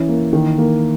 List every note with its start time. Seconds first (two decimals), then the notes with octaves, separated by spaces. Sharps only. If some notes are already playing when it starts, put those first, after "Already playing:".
Already playing: E3 C#4
0.09 A#3
0.33 D#3
0.58 A#3